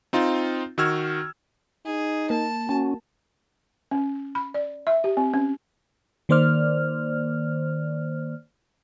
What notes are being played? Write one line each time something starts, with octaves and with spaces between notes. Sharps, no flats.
C4 D#4 F4
D#3 F#4 E6 F6 G#6
D#4 G#4
A#3 A5
C#4 F#4
C#4
B5
D5
E5
G4
C4
C#4
D#3 A#3 C5 D5 F6